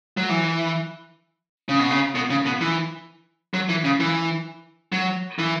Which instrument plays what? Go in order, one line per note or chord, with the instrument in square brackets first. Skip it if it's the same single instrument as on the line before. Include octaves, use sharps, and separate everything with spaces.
[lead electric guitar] F#3
E3
C#3
B2
C#3
B2
C#3
B2
E3
F#3
E3
C#3
E3
F#3
E3